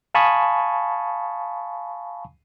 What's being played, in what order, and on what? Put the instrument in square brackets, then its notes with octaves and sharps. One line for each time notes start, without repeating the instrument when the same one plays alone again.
[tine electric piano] F5 G#5 A5 B5 C#6 D#6